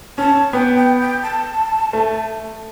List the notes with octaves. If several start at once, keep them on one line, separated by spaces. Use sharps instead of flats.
C#4 A5
B3 G5
G5
G5
A5
A3